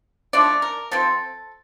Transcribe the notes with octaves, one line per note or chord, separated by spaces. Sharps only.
F3 A3 D4 D5
A#4
F3 C4 A4